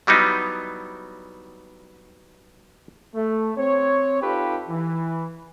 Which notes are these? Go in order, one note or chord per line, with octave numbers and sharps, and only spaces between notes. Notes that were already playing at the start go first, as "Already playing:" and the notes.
F#3 G3 B3 D#4 E4
A3
C4 C#5
D#4 F4 G4 A4 B4
E3